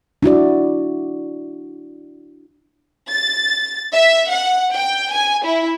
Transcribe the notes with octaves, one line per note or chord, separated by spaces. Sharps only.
D4 E4 F#4 D5
A6
E5
F#5
G5
G#5
E4